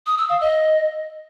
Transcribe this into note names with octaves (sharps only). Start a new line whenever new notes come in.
D#6
E6
F5
D#5